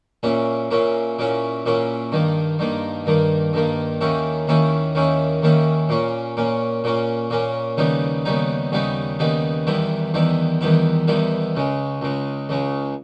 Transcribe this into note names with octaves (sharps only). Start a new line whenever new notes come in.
A#2 A#3 C#4 E4
A#2 A#3 C#4 E4
A#2 A#3 C#4 E4
A#2 A#3 C#4 E4
G2 D#3 A#3
G2 D#3 A#3
G2 D#3 A#3
G2 D#3 A#3
D#2 D#3 A#3 C#4 E4
D#2 D#3 A#3 C#4 E4
D#2 D#3 A#3 C#4 E4
D#2 D#3 A#3 C#4 E4
A#2 A#3 C#4
A#2 A#3 C#4
A#2 A#3 C#4
A#2 A#3 C#4
D#2 C#3 G3 B3 D#4
D#2 C#3 G3 B3 D#4
D#2 C#3 G3 B3 D#4
D#2 C#3 G3 B3 D#4
E2 D#3 G3 B3 E4
E2 D#3 G3 B3 E4
E2 D#3 G3 B3 E4
E2 D#3 G3 B3 E4
C#2 C#3 G#3
C#2 C#3 G#3
C#2 C#3 G#3